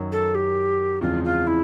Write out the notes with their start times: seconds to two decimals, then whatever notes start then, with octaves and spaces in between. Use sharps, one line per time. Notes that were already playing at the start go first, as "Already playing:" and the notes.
Already playing: F#2 D#3 F#3
0.11 A4
0.34 G4
1.01 E2 C#3 F3 G#3 C4 F4
1.24 F4
1.46 E4